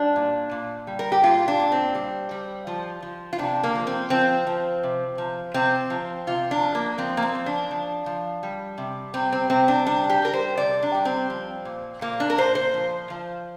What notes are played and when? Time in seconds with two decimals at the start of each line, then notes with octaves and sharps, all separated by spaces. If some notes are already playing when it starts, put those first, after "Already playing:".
Already playing: G3 D4
0.16 A#2
0.51 A#2
0.87 G3
0.99 A#4
1.12 G4
1.23 A#2 F4
1.48 D4
1.60 A#2
1.72 C4
1.95 G3
2.31 G3
2.67 F3
3.03 F3
3.33 F4
3.38 C3 D4
3.64 A#3
3.75 F3
3.87 C4
4.10 F3 C4
4.47 F3
4.83 C3
5.18 F3
5.54 C3 C4
5.90 F3
6.27 C3 F4
6.51 D4
6.63 F3
6.75 A#3
6.98 F3 C4
7.17 A#3
7.23 C4
7.35 F3
7.46 D4
7.71 F3
8.06 F3
8.43 G3
8.78 C3
9.14 G3 C4
9.32 C4
9.50 C3 C4
9.68 D4
9.87 G3 D4
10.10 G4
10.22 G3 A#4
10.33 C5
10.58 C3 D5
10.83 D4
10.95 G3
11.05 C4
11.30 F3
11.65 A#2
12.01 A#2 A#3
12.20 D4
12.30 A#4
12.38 A#2 C5
12.55 C5
12.74 F3
13.10 F3